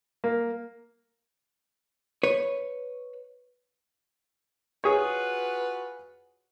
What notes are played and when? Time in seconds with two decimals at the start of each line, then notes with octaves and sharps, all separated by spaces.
0.24 A#3
2.23 B4 C#5
4.84 F4 F#4 G#4 B4 C#5